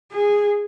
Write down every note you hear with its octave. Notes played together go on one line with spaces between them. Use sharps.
G#4